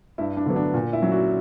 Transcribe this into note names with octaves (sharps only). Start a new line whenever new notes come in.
G2 E4
D4
D3 F#3 B3
D4
A#2
E4
F#3 C#4
F#4